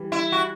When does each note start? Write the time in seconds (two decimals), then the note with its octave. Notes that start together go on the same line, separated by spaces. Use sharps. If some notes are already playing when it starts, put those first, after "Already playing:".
Already playing: E3 G3
0.12 E4
0.32 F#4